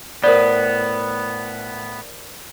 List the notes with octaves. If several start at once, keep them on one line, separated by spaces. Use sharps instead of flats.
A2 B3 A#4 C5 D5